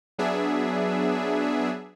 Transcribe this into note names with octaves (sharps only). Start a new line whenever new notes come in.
F#3 B3 D4 G#4 E5